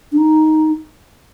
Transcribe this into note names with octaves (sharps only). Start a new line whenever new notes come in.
D4
D#4